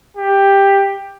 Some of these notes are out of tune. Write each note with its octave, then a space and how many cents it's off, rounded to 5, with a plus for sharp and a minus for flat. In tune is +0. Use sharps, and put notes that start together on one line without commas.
G4 +10